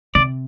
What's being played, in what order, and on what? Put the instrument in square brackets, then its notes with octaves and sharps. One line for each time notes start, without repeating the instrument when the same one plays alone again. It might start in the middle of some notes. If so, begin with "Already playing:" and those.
[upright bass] C3 [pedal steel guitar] D5